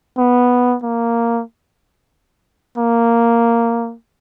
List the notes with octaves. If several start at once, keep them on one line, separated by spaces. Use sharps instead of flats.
B3
A#3
A#3